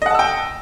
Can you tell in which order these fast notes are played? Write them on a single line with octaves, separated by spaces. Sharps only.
D#5 F#5 A5 E6 G5